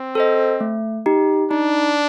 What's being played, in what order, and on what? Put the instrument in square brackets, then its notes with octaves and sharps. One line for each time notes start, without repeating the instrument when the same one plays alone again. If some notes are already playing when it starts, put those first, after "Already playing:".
Already playing: [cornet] C4
[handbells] A4 C5 D#5
A3
D#4 G4
[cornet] D4 [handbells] D#4